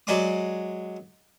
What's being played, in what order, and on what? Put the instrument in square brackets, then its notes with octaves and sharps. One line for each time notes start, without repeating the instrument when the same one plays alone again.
[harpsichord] F#3 G#3 D5 C6 D6